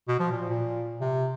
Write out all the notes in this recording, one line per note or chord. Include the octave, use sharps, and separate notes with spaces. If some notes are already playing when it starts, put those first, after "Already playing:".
B2
F3
A#2
A#2
C3